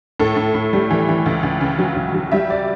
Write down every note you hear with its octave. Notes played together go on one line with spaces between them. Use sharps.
A2 A4
A2
A2
G3
E3
E3
C#2
C#2
C#3
F#3
C#2
F#3
G3 E5
D5